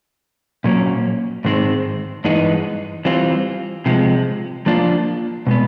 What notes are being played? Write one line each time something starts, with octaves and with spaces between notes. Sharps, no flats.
A#2 F#3 A#3 C#4
G#2 D#3 G#3 C4
G2 E3 G#3 B3 D#4
E3 G3 C4 F4
C3 F3 G#3
F3 A#3 D4 F4
B2 G#3 B3